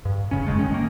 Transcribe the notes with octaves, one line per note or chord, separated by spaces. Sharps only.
G2
F1 C#3 C#4
F#1 F#2 G#3 A3
A1 D#3 C#4
A#3